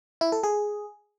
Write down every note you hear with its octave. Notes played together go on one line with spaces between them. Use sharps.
E4
A4
G#4